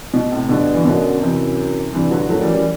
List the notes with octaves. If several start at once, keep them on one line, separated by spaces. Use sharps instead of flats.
B2
A2 C3
G2 B2 D3
E3
F#2 B2 D3
F#2 C3 E3
G2 C3 E3
D3 F#3
F#2 F#3 A3
E3 G3
E3 G3